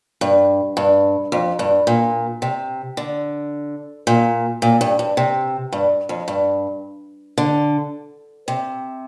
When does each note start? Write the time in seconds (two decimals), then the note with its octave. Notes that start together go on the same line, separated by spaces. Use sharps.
0.21 G2
0.77 G2
1.32 F2
1.59 G2
1.87 A#2
2.42 C3
2.97 D3
4.07 A#2
4.62 A#2
4.81 G2
4.99 G2
5.17 C3
5.72 G2
6.09 F2
6.28 G2
7.38 D3
8.48 C3